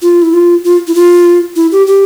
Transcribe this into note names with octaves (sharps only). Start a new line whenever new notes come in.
F4
E4
F4
F4
E4
F4
E4
G4
G4